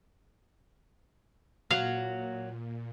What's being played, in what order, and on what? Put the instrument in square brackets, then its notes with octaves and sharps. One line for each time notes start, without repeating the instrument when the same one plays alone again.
[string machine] A#2 [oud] F#3 [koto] F5